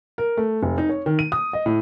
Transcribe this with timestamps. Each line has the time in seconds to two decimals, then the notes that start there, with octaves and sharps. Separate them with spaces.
0.18 A#4
0.37 A3
0.63 F1
0.78 D#4
0.89 C#5
1.06 D#3
1.19 D#7
1.32 D#6
1.53 D#5
1.66 A2